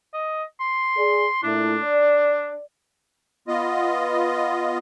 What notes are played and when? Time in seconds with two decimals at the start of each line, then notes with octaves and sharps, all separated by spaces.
0.14 D#5
0.60 C6
0.97 G#4 D5
1.43 A#2 A3 D4 E4
1.84 D5
3.48 B3 F4 D#5